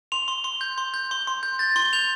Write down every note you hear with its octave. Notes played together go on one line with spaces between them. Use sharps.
C6 F7
C6
C6
G6
C6
G6
C6
C6
G6
G6 A6
C6 G7
G6 F7